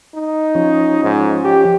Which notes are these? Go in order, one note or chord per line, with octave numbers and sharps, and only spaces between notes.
D#4
F3 C#4
G#2
G4